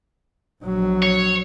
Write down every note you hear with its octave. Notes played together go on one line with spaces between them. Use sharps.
A#1 F#3
C#5